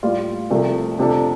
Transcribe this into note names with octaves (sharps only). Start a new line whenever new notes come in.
A2 G3 F4
C2 C3 F3 A3
F2 C3 F3 D4 A4